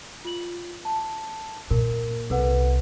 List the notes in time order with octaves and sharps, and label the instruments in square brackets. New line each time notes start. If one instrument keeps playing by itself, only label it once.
[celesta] F4 F#7
A5
[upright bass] A#2 [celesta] A#4
[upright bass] C2 [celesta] A4 B4 F#5